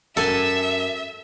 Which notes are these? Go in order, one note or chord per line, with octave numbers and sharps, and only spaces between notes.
F#2 A4 E5 G#5